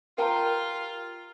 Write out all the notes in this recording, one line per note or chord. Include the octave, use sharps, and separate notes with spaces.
F4 G4 A#4 F5 G5 A5 A#5